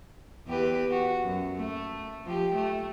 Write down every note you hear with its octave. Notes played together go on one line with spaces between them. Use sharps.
E2 G4 B4
F#4
F#2
A3
F3 G4
A3